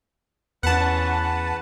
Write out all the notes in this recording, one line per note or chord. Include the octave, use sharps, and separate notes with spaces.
E2 E3 C#4 B4 F#5 A5